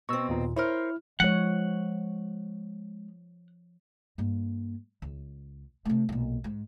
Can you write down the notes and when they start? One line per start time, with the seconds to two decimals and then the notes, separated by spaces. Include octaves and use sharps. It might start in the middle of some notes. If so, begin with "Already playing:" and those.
0.09 B2 C4 C#6 E6
0.29 D#2 A#2
0.56 E4 A#4 C5 C#5 F6
1.20 F3 G#3 C#5 F#5
4.18 G2 A#3
5.02 C#2
5.85 C3 A3
6.09 B1 A#2
6.44 G#2